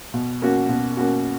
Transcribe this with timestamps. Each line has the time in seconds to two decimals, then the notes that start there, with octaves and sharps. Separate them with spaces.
0.14 B2
0.42 A#3 C#4 F#4
0.69 B2
0.97 A#3 C#4 F#4